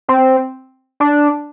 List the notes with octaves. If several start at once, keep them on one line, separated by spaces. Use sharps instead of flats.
C4
D4